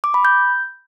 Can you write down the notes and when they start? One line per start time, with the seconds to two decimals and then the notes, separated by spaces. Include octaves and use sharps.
0.04 D6
0.14 B5
0.25 G6